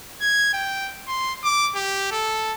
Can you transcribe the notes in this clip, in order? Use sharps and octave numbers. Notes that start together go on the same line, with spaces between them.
G#6
G5
C6
D6
G4
A4